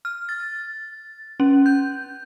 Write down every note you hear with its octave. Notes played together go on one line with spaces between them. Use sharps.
F6
A6
C#4
G6